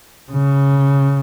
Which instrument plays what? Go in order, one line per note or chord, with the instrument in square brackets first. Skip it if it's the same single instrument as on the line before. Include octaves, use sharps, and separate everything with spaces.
[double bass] C#3